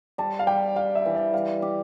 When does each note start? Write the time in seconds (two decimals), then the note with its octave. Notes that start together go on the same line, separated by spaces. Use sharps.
0.18 G3 A5
0.39 F5
0.47 G3 G5
0.76 G3 F5
0.95 E5
1.05 E3
1.15 D5
1.34 G3 F5
1.62 G4